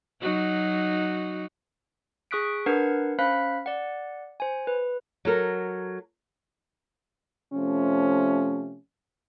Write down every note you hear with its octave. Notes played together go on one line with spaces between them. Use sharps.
F#3 D#4 F#4
G#4 C#6 D#6 F#6 B6 D7
D4 A#4 B4 F#5 G#6 C7
C#4 C5 F5 B5 F#6 B6
D5 F#5
C5 G#5
B4
F#3 A4 A#4
C3 F3 A3 C#4